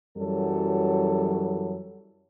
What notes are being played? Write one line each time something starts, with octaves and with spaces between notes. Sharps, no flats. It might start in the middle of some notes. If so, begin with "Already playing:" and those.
F#2 E3 F#3 G3 A4